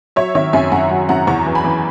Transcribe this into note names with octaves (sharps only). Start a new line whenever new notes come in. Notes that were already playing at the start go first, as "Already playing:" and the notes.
F#3 C#5 E5
D#3 C#5 E5
F#2 E5 G#5
F#2 F#5 A#5
F#3
F#2 F#5 A#5
E2 A#5 C#6
E3
G#5 B5
E3